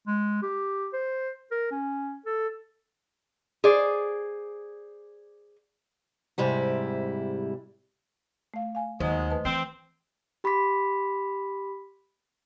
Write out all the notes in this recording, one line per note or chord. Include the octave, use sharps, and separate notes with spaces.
G#3
G4
C5
A#4
C#4
A4
G#4 C5 D5
G#2 C3 G3 E4
A3 F5
F5 G#5
D#2 F#3 G#3 C5 D#5
A3 B4 A5
E3 C4 C7
G4 B5 C6 D6 B6